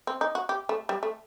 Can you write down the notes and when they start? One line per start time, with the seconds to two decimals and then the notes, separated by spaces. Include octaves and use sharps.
0.07 C4
0.21 D#4
0.35 F#4
0.49 G4
0.69 A3
0.89 G3
1.03 A3